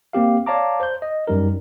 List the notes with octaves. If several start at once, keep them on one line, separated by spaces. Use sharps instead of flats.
A#3 C4 G4 F5
C#5 D5 F5 A5 A#5 D6
C5 G6
D#5
F#2 G3 D#4 A#4